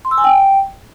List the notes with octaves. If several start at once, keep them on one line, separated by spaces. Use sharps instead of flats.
C6
E6
G#5
G5